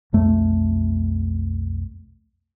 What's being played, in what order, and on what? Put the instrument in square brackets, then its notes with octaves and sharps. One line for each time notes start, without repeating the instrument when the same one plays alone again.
[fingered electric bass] B1 F2 A3